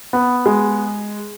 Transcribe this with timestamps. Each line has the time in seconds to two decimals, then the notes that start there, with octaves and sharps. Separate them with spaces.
0.13 B3
0.46 G#3